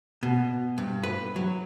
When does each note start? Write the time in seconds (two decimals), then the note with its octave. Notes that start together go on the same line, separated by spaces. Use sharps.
0.23 B2
0.78 G2
1.03 B4
1.36 F#3